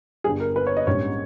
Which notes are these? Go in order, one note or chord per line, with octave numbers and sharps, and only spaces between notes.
G1 G2 G3 G#4
A#4
B4
C#5
D#5
A#1 G#2 G3 C#4 C#5